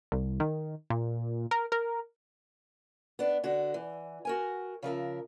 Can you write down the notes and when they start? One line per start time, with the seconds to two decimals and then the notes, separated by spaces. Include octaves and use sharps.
0.12 C2
0.40 D#3
0.90 A#2
1.51 A#4
1.72 A#4
3.19 B3 D4
3.44 D3 F#4
3.74 E3
4.25 F#4 A#4 G#5
4.83 C#3 F3 A#4 E5